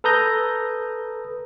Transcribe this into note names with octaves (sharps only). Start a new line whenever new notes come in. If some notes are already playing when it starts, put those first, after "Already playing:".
A4 B4 A#5 D#6 G6 A#6